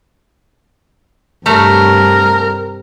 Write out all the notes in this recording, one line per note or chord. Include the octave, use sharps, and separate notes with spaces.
G2 C3 A3 A#4 C#5